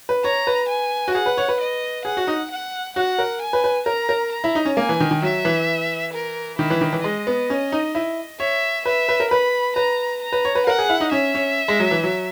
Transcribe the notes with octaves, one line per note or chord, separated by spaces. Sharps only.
B4
C#5 A#5
B4
G#5
F#4
G#4 F#5
B4
C#5
B4
D#5
G#4 F#5
F#4
D#4
F#5
F#4 F#5
A#4
G#5
B4
B4
A#4 A#5
A#4
A#5
E4
D#4
C#4
A#3 G#5
E3
D#3
D#3
F#3 E5
E3
A#4
D#3 E4
E3
D#3
E3
G#3 D#5
B3
C#4
D#4
E4
C#5 E5
B4 E5
B4
A#4
B4 B5
B4 A#5
A#5
B4
C#5
B4
A#4 F#5
G#4
E4
D#4
C#4 E5
C#4
G#3
F#3
E3
F#3